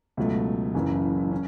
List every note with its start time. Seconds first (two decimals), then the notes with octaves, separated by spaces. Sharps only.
0.17 C#2 B2 F#3 A3
0.74 F#1 F#2 C#3 E3
1.31 C#4